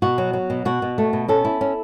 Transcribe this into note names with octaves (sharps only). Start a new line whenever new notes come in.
B2 F#4
F#3
F#3
B2
B2 F#4
B2
A3
B2
C#4 A4
E4
C#4